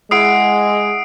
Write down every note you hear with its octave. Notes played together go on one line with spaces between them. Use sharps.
G#3 E4 G#4 F#5 D#6 C7 D7